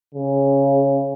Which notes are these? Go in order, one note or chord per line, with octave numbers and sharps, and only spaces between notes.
C#3